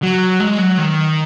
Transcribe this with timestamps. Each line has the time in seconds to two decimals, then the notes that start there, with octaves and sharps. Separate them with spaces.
0.03 F#3
0.40 G#3
0.59 F#3
0.78 D#3